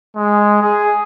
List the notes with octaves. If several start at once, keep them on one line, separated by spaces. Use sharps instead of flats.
G#3
G#4